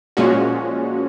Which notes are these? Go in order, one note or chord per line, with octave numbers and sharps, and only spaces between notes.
A#2 F3 G#3 C#4 F#4